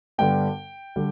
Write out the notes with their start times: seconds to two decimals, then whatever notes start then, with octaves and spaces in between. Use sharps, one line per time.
0.18 G2 D3 G3 B3 G5
0.96 D3 G3